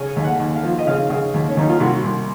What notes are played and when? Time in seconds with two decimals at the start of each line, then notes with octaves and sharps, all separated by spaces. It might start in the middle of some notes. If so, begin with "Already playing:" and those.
Already playing: C#3 G#5
0.16 D#2
0.24 F#5
0.39 D#2
0.56 F5
0.63 F3
0.78 D#5
0.87 C#3 F5
1.10 C#3
1.34 D#2
1.49 C#4
1.57 D#2 D#4
1.69 F4
1.80 C2 F#4
2.03 C2